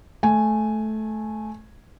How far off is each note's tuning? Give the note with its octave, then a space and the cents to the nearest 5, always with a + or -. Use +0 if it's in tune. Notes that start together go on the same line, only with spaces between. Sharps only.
A3 -15 G#5 +0